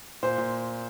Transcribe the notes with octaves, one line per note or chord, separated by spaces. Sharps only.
A#2 C5
A#2